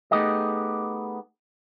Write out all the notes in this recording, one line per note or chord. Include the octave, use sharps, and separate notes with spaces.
A3 B3 D#4 G4 G#4 D#5